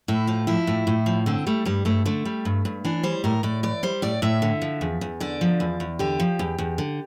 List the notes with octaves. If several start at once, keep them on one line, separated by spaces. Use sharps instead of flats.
A2 E4
F3 F4
F3 E4
A2
A2
F3
D3 C4
G3 A3
G2 G3
G2 A3
D3 A3
G3
G2
G2
E3 D4
G3 C5
A2 A#4
A2 D5
E3 D5
G3 C5
A2 D5
A2 E5
D3
F3
E2
E2
D3 D5
F3
E2
E2
D3 G4
F3
E2
E2
D3